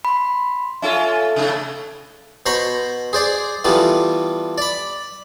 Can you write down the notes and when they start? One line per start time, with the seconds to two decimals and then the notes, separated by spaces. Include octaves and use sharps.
0.05 B5 C6
0.82 C#4 F4 A4 E5
1.36 A2 C3
2.46 B2 C5 A#5 B5 C#6
3.13 G#4 C5 D5
3.64 E3 G3 A3 B3 F4
4.58 D5 B5